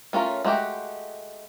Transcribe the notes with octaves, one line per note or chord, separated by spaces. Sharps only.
A3 C#4 F4 A#4
G#3 A3 F#4 G4